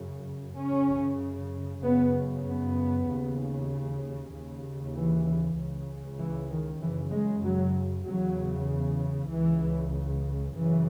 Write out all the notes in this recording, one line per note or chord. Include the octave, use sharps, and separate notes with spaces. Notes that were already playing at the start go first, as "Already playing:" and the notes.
Already playing: F#2 C#3
F#2 C#3 C#4
F#2 C#3 B3
B3
D#2 C#3
D#2
C#3
E3
C#2 C#3
E3
D#3
F#2 C#3 E3
G#3
F#3
E2 C#3 F#3
C#2 C#3 E3
F#2 C#3 E3